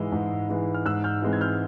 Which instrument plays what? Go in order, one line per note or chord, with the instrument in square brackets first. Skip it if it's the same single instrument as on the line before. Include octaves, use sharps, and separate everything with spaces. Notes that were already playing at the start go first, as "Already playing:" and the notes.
Already playing: [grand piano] G#2 E3 G#3 E6
G#2
E3 G#3
F6
G#2 E6 F#6
F6 G6
E3 G#3 C4
G#6
F6 G6